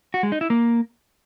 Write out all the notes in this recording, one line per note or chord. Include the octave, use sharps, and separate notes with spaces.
F#4
G#3
D#4
E4
A#3